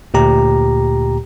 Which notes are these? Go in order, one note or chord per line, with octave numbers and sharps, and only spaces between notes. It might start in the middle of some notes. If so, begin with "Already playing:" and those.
D2 A#2 G4 A#5